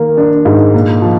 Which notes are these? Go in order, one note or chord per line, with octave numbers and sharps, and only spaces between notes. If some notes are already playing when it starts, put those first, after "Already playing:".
Already playing: D#3 A#3
D4
G#2
A#2
F3